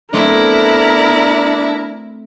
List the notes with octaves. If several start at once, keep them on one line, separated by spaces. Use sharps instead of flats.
A3 B3 C4 D4 E4 A#4